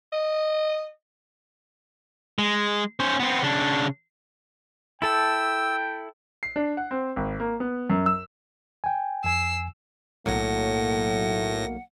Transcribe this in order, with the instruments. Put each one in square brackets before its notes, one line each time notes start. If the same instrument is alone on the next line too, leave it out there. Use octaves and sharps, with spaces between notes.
[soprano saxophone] D#5
[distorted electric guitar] G#3
C#4 C5
B3 C4
C#3 D4
[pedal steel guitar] E4 A4 A5 [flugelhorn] G5 [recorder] E6
[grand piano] C7
D4
F#5
C4
G#1
A#3
B3
F#2
E6
[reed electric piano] G5 G#5
[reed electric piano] F2 G#5 [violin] E6 C7
[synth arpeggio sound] B1 F#3 A#3 [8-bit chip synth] A2 A#6 [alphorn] A3 [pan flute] F#5